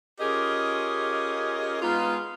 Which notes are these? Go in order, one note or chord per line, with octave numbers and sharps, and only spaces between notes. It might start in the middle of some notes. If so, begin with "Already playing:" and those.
C#4 F4 G4 G#4 A#4 D#5
G#3 B3 D#4 F4